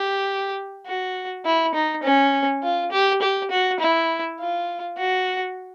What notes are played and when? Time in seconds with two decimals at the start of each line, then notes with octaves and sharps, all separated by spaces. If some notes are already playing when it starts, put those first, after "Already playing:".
Already playing: G4
0.86 F#4
1.45 E4
1.74 D#4
2.03 C#4
2.63 F4
2.92 G4
3.22 G4
3.51 F#4
3.80 E4
4.40 F4
4.98 F#4